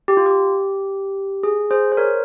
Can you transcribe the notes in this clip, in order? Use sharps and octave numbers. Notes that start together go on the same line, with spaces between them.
G4
F4
G4
G#4
G#4 C5
C5
A#4 C#5